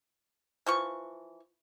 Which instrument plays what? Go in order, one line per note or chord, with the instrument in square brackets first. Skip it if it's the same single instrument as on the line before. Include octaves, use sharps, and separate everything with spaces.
[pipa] E3 F3 C#6